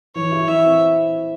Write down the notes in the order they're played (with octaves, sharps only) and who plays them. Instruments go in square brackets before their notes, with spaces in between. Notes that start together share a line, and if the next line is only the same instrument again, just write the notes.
[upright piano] E3 [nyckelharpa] C#5
[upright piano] E4
[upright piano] E3 [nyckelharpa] E5
[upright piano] C4